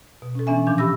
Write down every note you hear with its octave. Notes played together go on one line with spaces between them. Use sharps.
B2
C#4 A4
E3 B3 C#4 D4 E5 G#5
A#2 E3 F3 D4 G6
G4 B5 E6 A#6